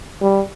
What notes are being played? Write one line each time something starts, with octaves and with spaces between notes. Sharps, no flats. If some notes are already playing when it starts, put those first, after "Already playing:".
G3